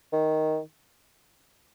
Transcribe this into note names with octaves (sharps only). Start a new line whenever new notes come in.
D#3